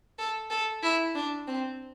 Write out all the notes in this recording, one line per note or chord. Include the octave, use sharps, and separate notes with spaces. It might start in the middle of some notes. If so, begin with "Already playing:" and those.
A4
A4
E4
D4
C4